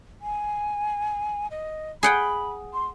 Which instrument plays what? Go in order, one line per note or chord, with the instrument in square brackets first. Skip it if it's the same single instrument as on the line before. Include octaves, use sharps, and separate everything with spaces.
[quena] G#5
D#5
[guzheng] G#4 F#5 G5 [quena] B5
[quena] C6